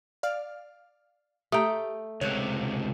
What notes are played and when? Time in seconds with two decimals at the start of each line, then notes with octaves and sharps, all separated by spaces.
0.23 D5 F5 F6
1.52 A3 G4 G5 A#5 D#6
2.21 C#2 C3 C#5 F#6